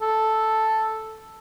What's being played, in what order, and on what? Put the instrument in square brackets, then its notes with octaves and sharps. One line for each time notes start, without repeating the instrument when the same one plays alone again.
[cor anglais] A4